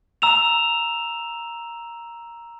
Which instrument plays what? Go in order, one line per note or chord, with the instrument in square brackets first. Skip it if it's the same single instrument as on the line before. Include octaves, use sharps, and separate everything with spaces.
[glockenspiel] A#5 E6 E7 F7